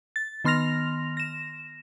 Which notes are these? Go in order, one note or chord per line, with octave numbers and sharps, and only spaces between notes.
A6
D#3 B3 C6 F6 A#6 F7
A#6 E7